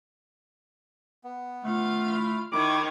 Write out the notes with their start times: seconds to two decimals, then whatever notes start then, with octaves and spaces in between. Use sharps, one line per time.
1.24 B3
1.65 A3 F4 F5
2.13 E4 B5
2.52 D#3 E4 C#5 D6